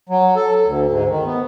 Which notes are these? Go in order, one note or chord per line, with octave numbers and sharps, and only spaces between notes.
F#3
A4
D2
G#2
D#3
B3